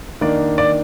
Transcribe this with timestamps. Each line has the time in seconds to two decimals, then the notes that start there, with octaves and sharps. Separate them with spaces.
0.21 D#3 A#3 D4 D5
0.58 D5